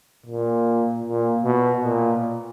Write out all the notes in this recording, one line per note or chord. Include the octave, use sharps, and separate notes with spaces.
A#2
A#2
B2
A#2